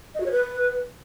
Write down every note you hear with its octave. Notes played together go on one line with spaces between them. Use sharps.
D#5
F#4
C#5
B4